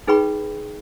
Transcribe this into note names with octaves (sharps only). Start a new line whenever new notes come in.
D#4 G#4 B4 G5 B5 C#6